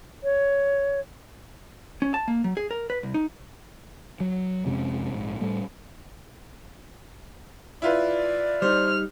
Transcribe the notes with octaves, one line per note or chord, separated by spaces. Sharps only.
C#5
C#4
A5
A#3
F#3
G#4
A#4
B4
C2
D#4
F#3
F2 C3 G#3 C#4
A#1 G#2
A2 G3 A3
E4 F4 B4 D5
G3 D#4 C5 F6